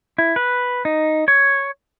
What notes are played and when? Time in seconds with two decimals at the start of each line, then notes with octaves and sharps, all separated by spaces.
0.18 E4
0.36 B4
0.85 D#4
1.28 C#5